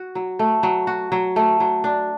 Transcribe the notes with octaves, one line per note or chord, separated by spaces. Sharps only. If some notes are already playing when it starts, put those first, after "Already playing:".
Already playing: F#4
F#3
A3
F#3
F#4
F#3
A3
F#3
D4